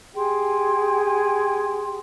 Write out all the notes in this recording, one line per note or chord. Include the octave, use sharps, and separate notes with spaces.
G4 G#4 G5 C6